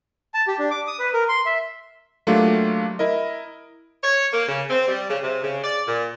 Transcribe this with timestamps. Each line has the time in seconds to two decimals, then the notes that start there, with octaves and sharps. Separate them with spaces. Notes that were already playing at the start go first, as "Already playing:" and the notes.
0.34 A5
0.48 G4
0.59 D4
0.71 D6
0.87 D#6
0.99 B4
1.14 A#4
1.29 C6
1.46 E5
2.27 F#3 A3 A#3 D4 F4 G4
2.99 E4 A#4 D#5
4.03 C#5
4.32 A#3
4.48 C#3
4.69 C4
4.87 G3
5.09 C#3
5.23 C3
5.43 C#3
5.64 D5
5.87 A#2